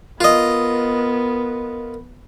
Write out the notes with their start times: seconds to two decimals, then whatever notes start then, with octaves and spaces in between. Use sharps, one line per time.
0.21 B3 F4 A#4 D#5